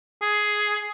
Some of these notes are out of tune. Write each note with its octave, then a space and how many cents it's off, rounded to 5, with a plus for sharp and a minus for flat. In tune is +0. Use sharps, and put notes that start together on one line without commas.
G#4 +10